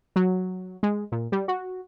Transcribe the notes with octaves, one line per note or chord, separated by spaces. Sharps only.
F#3
G#3
A#2
G3
F#4